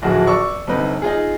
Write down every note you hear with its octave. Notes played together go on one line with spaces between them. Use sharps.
D1 A#1 F#4 G#4
D5 C#6 E6
G1 C3 D#4 B4
D#4 F4 G#4